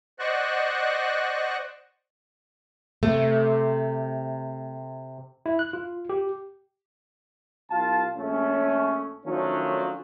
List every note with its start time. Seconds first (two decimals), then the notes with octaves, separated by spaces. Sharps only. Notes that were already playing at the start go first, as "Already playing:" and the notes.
0.19 C5 D5 D#5 F#5 C#6 F#6
3.03 C3 A3
5.46 E4
5.59 F#6
5.73 F4
6.10 G4
7.71 C2 F4 F5 A5
8.17 A#1 A3 C#4
9.26 D#3 F3 F#3 A3 C#4 D4